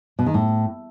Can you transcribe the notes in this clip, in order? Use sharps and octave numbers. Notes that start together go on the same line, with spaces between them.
B2
D#3
A2